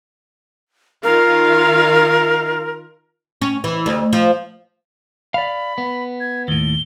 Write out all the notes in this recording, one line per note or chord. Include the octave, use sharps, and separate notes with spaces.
D#3 F4 A#4 F5
C#4
E3
D2
F3
D5 F5 B5
B3
G#6
D#2 A2 G7